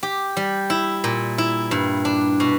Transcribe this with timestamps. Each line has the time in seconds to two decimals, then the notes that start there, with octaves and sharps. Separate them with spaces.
0.03 G4
0.37 G3
0.70 E4
1.04 A#2
1.38 E4
1.71 G2
2.05 D4
2.40 B2